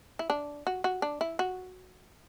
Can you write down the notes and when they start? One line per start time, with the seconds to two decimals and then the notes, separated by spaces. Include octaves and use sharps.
0.19 E4
0.30 D4
0.67 F#4
0.84 F#4
1.02 D4
1.21 E4
1.39 F#4